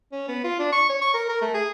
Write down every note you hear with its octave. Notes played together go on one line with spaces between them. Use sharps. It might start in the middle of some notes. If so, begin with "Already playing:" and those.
C#4
B3
F4
D4
C#6
C#5
C#6
A#4
A#4
A3
G#4